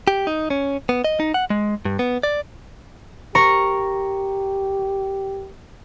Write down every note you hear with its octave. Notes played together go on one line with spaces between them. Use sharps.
G4
D#4
C#4
B3
D#5
D#4
F#5
G#3
G2
B3
D5
G4 A#4 A#5 C#6